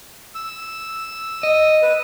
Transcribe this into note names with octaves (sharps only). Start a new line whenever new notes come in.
E6
D#5
B4